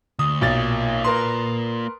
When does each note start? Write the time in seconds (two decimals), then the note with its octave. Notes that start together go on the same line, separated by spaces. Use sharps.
0.19 D2 D#6
0.41 B1 A#3 F4 A6
1.04 A#4 B4 C6